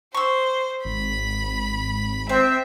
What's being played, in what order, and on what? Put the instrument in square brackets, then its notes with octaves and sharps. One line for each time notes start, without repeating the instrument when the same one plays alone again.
[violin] C5 [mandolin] C#6 E6
[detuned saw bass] G#1 [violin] B5
[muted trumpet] C4 [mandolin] C5 [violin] E5